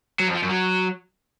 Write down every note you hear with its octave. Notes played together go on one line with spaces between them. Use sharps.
F#3
F2
F3
F#2
F#3